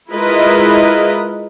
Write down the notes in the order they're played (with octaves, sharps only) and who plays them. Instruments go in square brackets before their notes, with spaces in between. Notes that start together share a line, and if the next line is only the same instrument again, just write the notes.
[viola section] G#3 E4 F4 A#4 B4 D#5